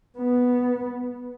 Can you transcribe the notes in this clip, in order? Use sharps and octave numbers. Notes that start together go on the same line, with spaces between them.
B3